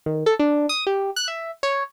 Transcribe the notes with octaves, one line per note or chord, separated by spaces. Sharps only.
D#3
A4
D4
D#6
G4
F#6
E5
C#5